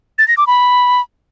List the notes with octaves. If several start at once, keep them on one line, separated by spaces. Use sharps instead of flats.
A6
A#6
D6
B5